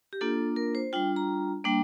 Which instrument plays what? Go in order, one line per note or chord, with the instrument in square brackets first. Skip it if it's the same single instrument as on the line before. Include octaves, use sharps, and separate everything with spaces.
[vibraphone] G4
A#3 D4 F4 A4
A#4
C5
G3 D4 F4 G5
A#5
G3 A#3 D4 G5